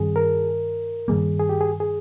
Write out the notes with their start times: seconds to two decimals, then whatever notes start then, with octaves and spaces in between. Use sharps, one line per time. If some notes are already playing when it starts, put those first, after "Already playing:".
Already playing: G2 D#3 G3 C4 G#4
0.16 A#4
1.08 G2 D#3 G3 A#3 G#4
1.39 G#4
1.49 G4
1.61 G#4
1.80 G#4